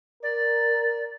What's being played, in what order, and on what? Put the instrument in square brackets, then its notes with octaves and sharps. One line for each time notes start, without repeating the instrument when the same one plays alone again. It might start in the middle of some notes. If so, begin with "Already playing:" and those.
[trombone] A#4 [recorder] D5